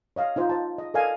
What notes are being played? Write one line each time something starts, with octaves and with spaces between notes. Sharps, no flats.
C#5 D#5 F5
D#4 F4 C5
C5 A5
D#5
A4 A#4 D5 D#5 F5 G#5